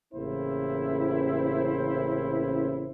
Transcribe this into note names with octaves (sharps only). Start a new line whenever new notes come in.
A1 C#3 A#3 C4 E4 C5